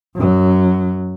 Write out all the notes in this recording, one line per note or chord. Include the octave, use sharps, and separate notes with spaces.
F#2 F#3